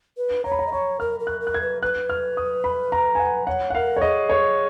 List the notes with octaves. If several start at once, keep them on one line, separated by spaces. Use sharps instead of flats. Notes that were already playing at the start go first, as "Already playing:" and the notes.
B4
C#5 A#5
B5
A#5
D#5
C#5 C#6
A#4 F6
A#4
F#6
A#4
F#6
G#6
B4
B4 F#6
F6
D#6
B5
A#5
G#5
F#5
C#5 F#5
F#5
A#4 F5
C#5
G#4 D#5
C#5